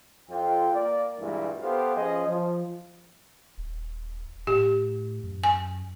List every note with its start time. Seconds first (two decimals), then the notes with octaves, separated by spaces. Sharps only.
0.30 F2 F4 G5
0.73 A#3 D5
1.19 G2 A#2 E3 G#3 E4 F#4
1.61 B3 G4 A4 C5 F5
1.96 F3 C#4 G#4 D#5
2.27 F3
3.58 D#1
4.47 A2 G4
5.23 F#2
5.44 G#5